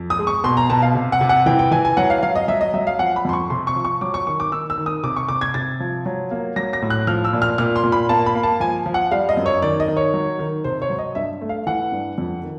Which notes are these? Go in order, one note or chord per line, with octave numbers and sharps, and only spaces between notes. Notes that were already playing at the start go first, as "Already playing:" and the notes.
Already playing: F2
D#6
G#3
C#6
B2 C6
A#5
B2 A5
F5
C3
F#5
C3
F#5
E3 G5
G5
E3 G#5
G#5
F#3 F#5
F5
F#3 F5
D#5
F#3 E5
D#5
F#3 E5
F5
F3 F#5
B5
F2 C6
C#6
C3 C6
C#6
F3
C#6
F#3 D6
C#6
D#3 C#6
D6
D#3 E6
E6
D#3
D#6
C3 D6
C#6
C3 D6
G#6
C3 A6
F3
F#3
A#3
F#3 A#6
A#6
A2
F#6
F3 F6
E6
A#2
F6
A#2 F6
C6
A#2
B5
A#3 A5
B5
A#3
A5
F3 G#5
F3
F#5
G3 F5
D#5
F#2
C#5
D#3 D5
D#5
D#3
C#5
F#3
D#3
C3 C5
C#5
F#3
D#5
G2 E5
A3
F5
E3 F#5
G2
F2
D#3